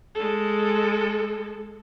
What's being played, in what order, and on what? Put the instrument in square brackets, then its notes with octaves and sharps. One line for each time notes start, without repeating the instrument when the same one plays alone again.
[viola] G#3 A4